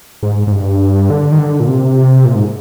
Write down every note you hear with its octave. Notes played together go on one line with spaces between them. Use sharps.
G#2
G#2
G2
D3
D#3
D3
A#2
C3
A#2
G#2